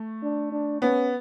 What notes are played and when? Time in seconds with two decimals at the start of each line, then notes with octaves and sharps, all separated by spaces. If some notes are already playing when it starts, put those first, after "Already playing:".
Already playing: A3
0.23 D4
0.52 D4
0.82 B3 C#4